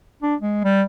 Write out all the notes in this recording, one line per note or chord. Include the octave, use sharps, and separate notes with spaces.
D4
G#3
G3